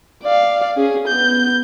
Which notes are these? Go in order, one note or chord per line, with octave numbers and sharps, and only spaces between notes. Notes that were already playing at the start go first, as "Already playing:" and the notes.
D5 F5
C#4 G#4
B3 G6